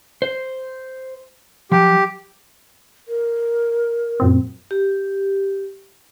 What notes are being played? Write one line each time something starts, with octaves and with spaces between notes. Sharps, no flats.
C5
F3 F#3 G4
A#4
F#2 A#2 C4
G4